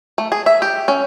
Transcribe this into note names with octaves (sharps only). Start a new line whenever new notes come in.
A3
G#4
E5
G4
C#4